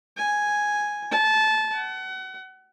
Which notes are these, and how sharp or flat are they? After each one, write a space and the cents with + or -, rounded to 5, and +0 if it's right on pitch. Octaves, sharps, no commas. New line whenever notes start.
G#5 +0
A5 -20
F#5 +30